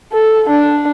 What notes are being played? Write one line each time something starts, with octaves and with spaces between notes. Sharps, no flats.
A4
D4